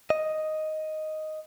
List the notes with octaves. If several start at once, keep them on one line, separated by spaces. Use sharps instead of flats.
D#5